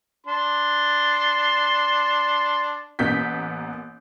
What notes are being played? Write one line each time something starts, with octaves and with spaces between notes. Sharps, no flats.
D4 C6
A1 A#3 B3 G6 B6